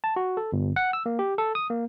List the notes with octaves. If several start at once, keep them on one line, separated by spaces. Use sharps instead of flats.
A5
F#4
A4
G1
F#5
E6
A#3
G4
A4
D#6
A#3